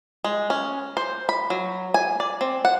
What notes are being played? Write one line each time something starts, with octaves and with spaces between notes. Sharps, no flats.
G#3
C#4
C5
B5
F#3
G#5
D5
C4
F#5